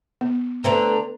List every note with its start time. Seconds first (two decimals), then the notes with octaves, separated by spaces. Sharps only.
0.21 B3
0.64 D3 A3 C4 B4 A#5